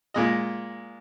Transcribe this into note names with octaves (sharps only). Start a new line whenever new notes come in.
A#2 G#3 D#5